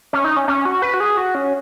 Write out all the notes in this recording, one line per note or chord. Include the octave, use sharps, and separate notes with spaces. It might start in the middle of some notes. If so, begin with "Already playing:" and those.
C#4
D#4
C#4
C#4
F#4
B4
F#4
G#4
F#4
C#4